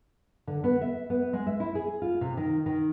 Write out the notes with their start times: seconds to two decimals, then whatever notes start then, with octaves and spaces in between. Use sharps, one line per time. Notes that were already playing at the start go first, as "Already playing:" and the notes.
0.47 D3
0.64 B3
0.81 E5
1.10 B3
1.33 G#3
1.46 E5
1.60 E4
1.75 G#4
2.02 F4
2.21 C3
2.37 D#3
2.66 D#3